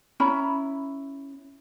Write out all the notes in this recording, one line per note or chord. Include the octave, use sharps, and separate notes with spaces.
C#4 E4 A#5 B5